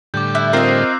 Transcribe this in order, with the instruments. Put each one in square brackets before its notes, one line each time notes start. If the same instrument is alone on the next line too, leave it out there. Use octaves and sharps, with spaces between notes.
[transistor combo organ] A2 D3 G3 [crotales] D6 G6
[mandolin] E4 [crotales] D6 E6 F#6
[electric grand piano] C4 F4 A#4 [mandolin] C5 D#5
[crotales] C7